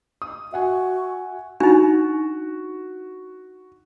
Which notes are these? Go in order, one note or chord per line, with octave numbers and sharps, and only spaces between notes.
D#6
F#4 E5 F#5 G#5
D4 D#4 F#4